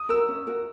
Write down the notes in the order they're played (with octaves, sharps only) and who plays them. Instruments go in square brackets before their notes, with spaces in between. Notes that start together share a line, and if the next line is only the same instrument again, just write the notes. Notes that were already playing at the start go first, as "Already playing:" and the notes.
Already playing: [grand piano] D#6
[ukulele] F#4 A#4 [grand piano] E6
[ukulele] C#4
F#4 A#4